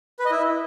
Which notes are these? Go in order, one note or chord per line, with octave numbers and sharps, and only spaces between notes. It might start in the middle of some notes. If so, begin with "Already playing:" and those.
B4
D#5
E4